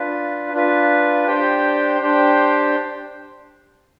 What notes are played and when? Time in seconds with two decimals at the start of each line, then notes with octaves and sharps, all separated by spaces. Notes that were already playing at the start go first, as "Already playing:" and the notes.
Already playing: D4 F4 B4
0.53 D4 F4 B4
1.27 D4 G4 C5 G5
2.01 D4 G4 C5 G5